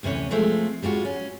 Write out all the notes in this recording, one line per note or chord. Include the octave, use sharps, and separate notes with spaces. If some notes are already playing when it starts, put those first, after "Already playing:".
D2 C3 E3 C#4 C#5
F3 G#3 A3 C4
G3 G#3 F4 F#4
C#4